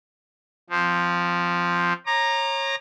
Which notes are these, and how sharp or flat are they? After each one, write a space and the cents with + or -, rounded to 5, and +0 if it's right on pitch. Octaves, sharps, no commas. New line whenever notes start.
F3 +0 C4 +0
C#5 -25 A#5 +0 D6 +45